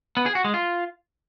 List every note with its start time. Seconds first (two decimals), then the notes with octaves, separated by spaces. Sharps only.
0.17 B3
0.26 G#4
0.35 F#4
0.44 G#3
0.54 F4